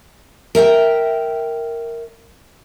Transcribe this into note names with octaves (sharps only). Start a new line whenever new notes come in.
A#4 E5 F#5 G5